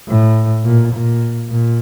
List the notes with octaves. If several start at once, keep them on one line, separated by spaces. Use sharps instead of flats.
A2
A#2
A#2
A#2